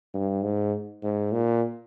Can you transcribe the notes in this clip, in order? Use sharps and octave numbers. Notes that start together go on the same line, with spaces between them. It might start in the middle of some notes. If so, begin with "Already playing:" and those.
G2
G#2
G#2
A#2